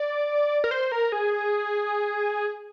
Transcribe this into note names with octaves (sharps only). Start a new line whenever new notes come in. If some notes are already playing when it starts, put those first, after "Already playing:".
Already playing: D5
A#4
C5
A#4
G#4